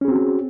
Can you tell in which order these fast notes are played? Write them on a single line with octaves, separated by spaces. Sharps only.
C#4 G#4 C4 F#4